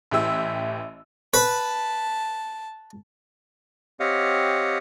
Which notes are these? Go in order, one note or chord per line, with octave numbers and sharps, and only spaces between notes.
A1 E3 G4 E5 E6
B4 A5 B5
C4 G4 C#5 D#5 F5 F#5